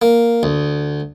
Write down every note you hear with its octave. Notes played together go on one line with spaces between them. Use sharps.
A#3
D2